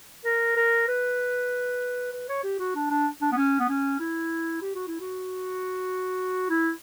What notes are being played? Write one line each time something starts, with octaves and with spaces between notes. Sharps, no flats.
A#4
A#4
B4
B4
C#5
G4
F#4
D4
D4
D4
B3
C#4
B3
C#4
E4
G4
F#4
E4
F#4
E4